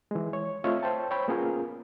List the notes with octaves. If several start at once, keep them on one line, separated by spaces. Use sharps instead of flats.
E3 G#3
C#5
A3 C4 F4 C#5 D#5 E5
C5 C#5 G5 A5
C5 C#5 G5 B5
A#3 B3 C#4 F4 G#4 A#4